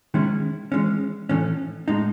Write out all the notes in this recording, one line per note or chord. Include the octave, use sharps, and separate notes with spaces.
D#3 G#3 C#4 E4
E3 G#3 C#4
A2 E3 A3 C#4
A2 G#3 D#4